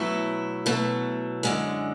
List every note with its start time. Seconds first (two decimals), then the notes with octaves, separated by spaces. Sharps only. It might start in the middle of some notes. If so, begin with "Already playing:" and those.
Already playing: B2 F#3 A3 E4
0.66 B2 F#3 A3
1.43 F#2 D3 G#3